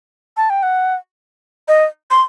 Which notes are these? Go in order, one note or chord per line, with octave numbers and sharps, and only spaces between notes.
A5
G5
F#5
D#5
C6